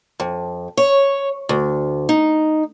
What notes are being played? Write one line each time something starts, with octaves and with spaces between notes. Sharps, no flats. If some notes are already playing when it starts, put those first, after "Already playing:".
F2
C#5
D2
D#4